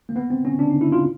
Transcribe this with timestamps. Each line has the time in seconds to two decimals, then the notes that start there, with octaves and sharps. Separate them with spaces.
0.09 A#3
0.16 B3
0.30 C4
0.45 C#4
0.59 D4
0.70 D#4
0.81 E4
0.92 F4